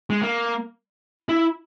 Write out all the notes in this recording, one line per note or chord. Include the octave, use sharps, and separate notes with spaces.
G#3
A#3
E4